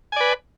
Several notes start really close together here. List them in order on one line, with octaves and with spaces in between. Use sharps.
G#5 D5 B4